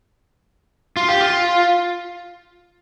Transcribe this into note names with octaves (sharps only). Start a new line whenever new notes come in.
F4
G4
F4